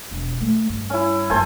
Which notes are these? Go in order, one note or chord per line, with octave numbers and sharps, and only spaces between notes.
E1
A3
G2
C#4 E4
F#1 F#2 A3 C5 G#5